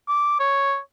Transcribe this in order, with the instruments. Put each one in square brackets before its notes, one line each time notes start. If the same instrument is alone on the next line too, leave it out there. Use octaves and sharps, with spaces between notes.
[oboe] D6
C#5